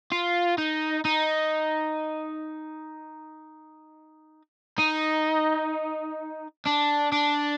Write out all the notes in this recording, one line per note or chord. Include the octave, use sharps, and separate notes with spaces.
F4
D#4
D#4
D#4
D4
D4